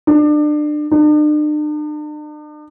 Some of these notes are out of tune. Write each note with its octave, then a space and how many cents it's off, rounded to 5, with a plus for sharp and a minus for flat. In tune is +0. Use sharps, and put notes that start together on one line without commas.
D4 +30
D4 +45